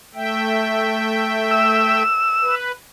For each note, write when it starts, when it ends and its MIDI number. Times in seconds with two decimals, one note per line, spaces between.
0.15 2.03 57
0.15 2.03 76
0.15 2.03 79
1.51 2.55 88
2.42 2.72 71